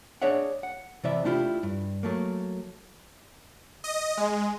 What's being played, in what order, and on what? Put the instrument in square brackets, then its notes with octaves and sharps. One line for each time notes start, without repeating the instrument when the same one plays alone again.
[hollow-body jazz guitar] D4 G#4 C#5 D5 E5 F#5
F#5
C3 E3 D5 E5
A3 D4 E4 F4 G4
G2
F#3 A3 A#3
[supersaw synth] D#5
G#3